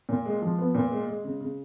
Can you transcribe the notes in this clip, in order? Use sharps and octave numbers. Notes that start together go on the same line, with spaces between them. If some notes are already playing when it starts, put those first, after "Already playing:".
A#2
G#3
F3
B3
A#2
G#3
G#3
C#3
C#3